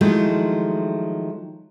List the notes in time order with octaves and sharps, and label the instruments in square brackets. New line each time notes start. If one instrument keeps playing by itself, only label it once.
[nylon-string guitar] D#3 F3 F#3 G#3 A3 E4